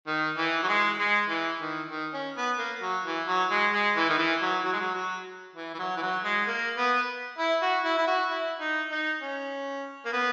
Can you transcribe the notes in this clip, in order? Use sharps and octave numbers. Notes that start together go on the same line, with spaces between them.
D#3
E3
F#3
G#3
G#3
E3
D#3
D#3
C#4
B3
A#3
F#3
E3
F#3
G#3
G#3
E3
D#3
E3
F#3
F#3
G#3
F#3
F#3
E3
E3
F#3
E3
F#3
G#3
A#3
B3
E4
F#4
E4
E4
F#4
E4
D#4
D#4
C#4
A#3
B3